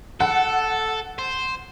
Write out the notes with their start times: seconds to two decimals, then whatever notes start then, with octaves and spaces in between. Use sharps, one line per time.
0.20 A4 F#5
1.19 C5